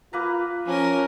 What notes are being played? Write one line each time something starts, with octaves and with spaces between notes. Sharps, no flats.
A#3 F4 B4 A#5
F3 C#4 A#4